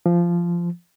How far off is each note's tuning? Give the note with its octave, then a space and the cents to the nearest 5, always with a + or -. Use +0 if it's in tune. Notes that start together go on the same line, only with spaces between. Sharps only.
F3 -15